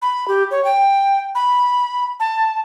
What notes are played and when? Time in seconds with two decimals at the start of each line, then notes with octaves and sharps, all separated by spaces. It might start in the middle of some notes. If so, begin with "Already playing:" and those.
0.02 B5
0.28 G4
0.51 C#5
0.65 G5
1.35 B5
2.20 A5